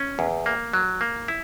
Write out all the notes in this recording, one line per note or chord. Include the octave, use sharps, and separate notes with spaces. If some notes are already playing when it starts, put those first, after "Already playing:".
Already playing: C#4
E2
A#3
F#3
A#3
E4